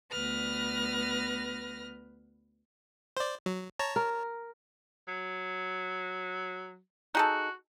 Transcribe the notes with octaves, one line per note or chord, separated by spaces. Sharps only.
D2 B3 B4 F6 A#6
C5 D5
F#3
C#5 A5 A#5
A#4
F#3
D#4 F#4 G#4 A4